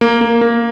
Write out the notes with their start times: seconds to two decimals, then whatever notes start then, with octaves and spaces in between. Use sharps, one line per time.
0.01 A#3
0.21 A#3
0.41 A#3